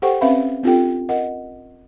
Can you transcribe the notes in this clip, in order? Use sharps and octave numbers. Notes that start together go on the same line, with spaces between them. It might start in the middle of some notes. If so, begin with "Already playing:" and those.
G4 A4 C5 F#5 G5 C#6
C4 C#4 B4 E5 F5 B5
C4 D4 F4 G4 A4 G5
A#4 D#5 F#5